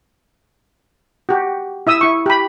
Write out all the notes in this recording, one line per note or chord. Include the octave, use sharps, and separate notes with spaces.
F#4 G4
E4 E5 D#6 E6
E4 C#6
G4 B5